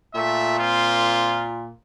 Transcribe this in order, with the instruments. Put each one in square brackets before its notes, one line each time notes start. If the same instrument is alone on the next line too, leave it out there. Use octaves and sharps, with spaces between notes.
[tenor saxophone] A#2 [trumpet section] A3 E5
[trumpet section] C4 F4